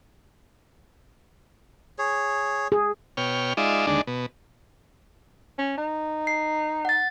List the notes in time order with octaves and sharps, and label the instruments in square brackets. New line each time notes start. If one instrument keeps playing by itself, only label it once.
[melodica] G#4 C#5
[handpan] G#4
[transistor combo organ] B2 C#5 G5 F6
G#3 D#4 F4 D5 E5
D#2 D3 G#3 D4
B2
[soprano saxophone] C#4
D#4
[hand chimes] C7
F#5 A6